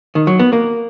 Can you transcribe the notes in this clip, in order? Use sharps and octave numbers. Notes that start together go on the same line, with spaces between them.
D#3
F#3
B3
A#3